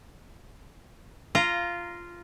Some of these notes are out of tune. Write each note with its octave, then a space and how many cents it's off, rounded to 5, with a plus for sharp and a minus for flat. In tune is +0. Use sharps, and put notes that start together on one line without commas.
F4 -10 A#5 +0